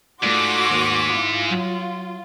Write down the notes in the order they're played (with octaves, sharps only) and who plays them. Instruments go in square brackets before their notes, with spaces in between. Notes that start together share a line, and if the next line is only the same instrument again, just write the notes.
[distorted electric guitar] G#2 [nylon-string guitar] A3 F4 D5 [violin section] F#4 C6 D6
[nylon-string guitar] D#2
[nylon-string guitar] E4 [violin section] F4
[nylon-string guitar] F#3